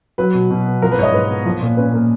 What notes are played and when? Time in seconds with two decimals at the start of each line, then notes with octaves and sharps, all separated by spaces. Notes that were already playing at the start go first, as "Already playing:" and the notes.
0.18 F#3 B4
0.34 B2
0.51 B2
0.66 B3
0.82 F3 A#4
0.92 B4
0.98 G#2 C#5
1.03 D#5
1.13 G#2 B4
1.29 B3
1.45 F3
1.61 A#2
1.77 C#4 B4
1.92 A#3